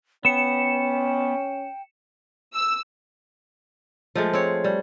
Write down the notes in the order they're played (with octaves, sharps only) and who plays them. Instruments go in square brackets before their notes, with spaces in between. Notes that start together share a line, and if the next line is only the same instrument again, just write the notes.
[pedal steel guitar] B3 [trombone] C#4 [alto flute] G5 [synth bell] C#7 E7
[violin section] E6
[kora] F3 G#3 A3
C4 C#5
G3